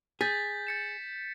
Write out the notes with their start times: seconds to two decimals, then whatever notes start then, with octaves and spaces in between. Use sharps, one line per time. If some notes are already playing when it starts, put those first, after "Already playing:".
0.21 G#4 G6 A6 B6
0.67 A6 C#7 E7